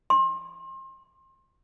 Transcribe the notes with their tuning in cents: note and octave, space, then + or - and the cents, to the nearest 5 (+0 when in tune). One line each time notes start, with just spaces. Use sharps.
C6 +30